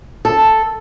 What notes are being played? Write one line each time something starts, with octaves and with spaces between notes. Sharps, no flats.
A4